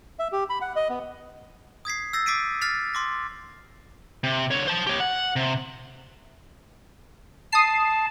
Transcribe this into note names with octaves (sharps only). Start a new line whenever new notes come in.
E5
G4
B5
F#5
D#5
B3
D#6 G#6 B6 C7
E6 G6 A6 A#6 C7
D6 A6 B6 C7 D7 D#7
F6 A6 B6 C7 F7
C6 D6 A#6
C3
D3 C#5
C5 A5
G4 C#5
F#5
C3
A5 D#6 C7